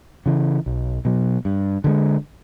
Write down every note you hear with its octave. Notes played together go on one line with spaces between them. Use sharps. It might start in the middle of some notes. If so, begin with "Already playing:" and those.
C#3 E3
B1
B2 F#3
G2
D3 F3 G#3